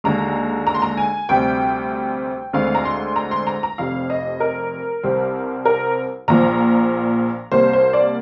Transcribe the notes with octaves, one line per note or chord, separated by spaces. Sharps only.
D#2 D3 G#3 A#5
A#5
C6
A#5
G#5
D2 C3 G3 C4 G5
D2 D3 G#3 C4 F5
A#5
C6
A#5
C6
A#5
A#5
F1 F2 C3 F5
D#5
A#4
C2 C3 G3 C4
A#4
A#1 A#2 F3 A#5
C2 C3 G3 A#3 C5
C5
D5